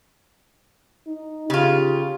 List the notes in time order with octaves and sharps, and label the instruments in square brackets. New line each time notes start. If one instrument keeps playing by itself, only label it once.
[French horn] D#4
[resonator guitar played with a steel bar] C#3 F4 [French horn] G4